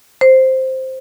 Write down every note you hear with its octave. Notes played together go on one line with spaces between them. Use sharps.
C5